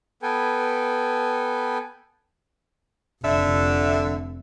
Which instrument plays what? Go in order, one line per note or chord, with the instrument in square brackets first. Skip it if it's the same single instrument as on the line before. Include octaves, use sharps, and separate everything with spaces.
[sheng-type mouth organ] B3 A4 B4 G5 G#5
[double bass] F1 [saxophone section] D3 E5